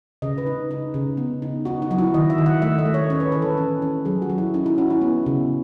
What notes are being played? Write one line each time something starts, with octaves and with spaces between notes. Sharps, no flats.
C#3 D#5
B4
D#4
D#4
C#3
B3
D#4
D#4 F#4
D#4
F#3 F#4
E4
D#3 D#5
E5
D#3
F#5
A3 E5
D#5
A3
C#5
C#4 C#5
B4
E3 A4
B4
C#4
C#4
F#3 G#4
F#4
F#3
E4
C#4 D#4
E4
C#4 F#4
E4
B3
C#3